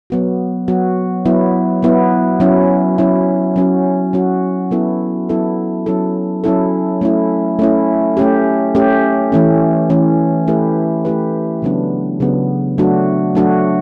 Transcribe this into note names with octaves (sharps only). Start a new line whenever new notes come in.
F#3 B3 F#4
F#3 B3 F#4
F#3 B3 E4
F#3 B3 E4
F#3 C#4 E4
F#3 C#4 E4
F#3 C#4 F#4
F#3 C#4 F#4
F#3 B3 E4 A4
F#3 B3 E4 A4
F#3 C#4 E4 A4
F#3 C#4 E4 A4
A3 C#4 E4
A3 C#4 E4
A3 C#4 G4
A3 C#4 G4
E3 A3 C#4
E3 A3 C#4
A3 E4 G4 B4
A3 E4 G4 B4
C#3 F#3 B3 D4
C#3 F#3 B3 D4
F#3 A3 D4 F#4
F#3 A3 D4 F#4